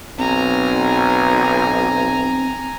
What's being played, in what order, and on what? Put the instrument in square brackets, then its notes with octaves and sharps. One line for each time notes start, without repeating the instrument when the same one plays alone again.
[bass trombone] B1 [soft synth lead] C4 [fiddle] G#5 A#5